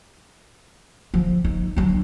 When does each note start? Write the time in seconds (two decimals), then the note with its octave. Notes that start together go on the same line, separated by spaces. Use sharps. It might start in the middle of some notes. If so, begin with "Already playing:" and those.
1.14 F3
1.44 D#4
1.76 F#3 D4